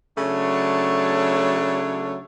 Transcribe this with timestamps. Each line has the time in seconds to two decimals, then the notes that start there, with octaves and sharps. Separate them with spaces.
0.18 C#3 F#3 A3 D4 C#5